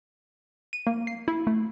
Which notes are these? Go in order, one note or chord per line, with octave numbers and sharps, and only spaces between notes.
D#7
A#3
C7
E4
A3